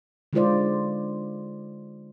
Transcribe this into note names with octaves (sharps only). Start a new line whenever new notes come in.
D3 G#3 D#4 F4 C5 D5